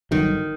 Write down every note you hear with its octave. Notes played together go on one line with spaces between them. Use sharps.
G1 G2 D3 D#3 F#3